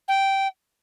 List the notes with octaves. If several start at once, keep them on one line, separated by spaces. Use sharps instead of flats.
G5